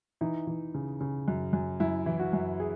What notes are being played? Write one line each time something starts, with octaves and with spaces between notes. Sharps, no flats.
E3 D#4
E3
C#3
C#3
F#2
F#2
F#2 E4
E3
F#4
F#2
G#4